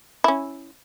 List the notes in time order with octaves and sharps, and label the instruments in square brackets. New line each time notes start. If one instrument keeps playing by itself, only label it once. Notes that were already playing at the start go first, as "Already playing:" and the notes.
[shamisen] C#4 E4